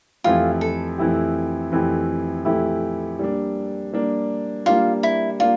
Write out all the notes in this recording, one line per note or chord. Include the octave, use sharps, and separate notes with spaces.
F2 E3 A3 E4 F4 G4
A4
F2 E3 A3 E4 G4
F2 E3 A3 E4 G4
F2 E3 A3 E4 G4
G3 A#3 D4
G3 A#3 D4
G3 A#3 D4 F4
E4
A#3 D4 F4